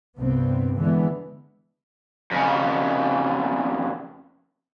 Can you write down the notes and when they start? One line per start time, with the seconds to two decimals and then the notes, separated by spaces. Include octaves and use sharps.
0.19 C2 G2 B3 C4
0.78 D3 E3 G#3 B3
2.32 F2 C#3